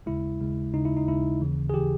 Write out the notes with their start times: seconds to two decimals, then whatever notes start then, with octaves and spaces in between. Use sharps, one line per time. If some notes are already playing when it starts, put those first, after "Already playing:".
0.06 D#2 C#3 G#3 E4
0.40 D#2 C#3 G#3
0.74 D#2 C#3 G#3 D#4
0.85 E4
0.97 D#4
1.07 D#2 C#3 G#3 E4
1.42 D#2 C#3 E3
1.70 G#4
1.74 C#3 E3 G4